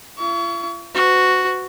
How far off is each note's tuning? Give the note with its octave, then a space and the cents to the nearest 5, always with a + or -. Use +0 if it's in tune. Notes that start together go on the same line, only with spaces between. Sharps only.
F4 -45 C#6 +35
F#4 +0 B4 +45